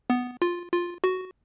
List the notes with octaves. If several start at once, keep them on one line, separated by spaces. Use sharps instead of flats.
B3
F4
F4
F#4